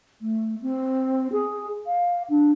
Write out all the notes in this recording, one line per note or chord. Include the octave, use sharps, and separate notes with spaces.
A3
C4
G#4
F5
D4